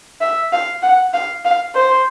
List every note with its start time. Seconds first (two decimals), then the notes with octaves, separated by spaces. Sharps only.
0.21 E5
0.53 F5
0.83 F#5
1.14 F5
1.45 F5
1.75 C5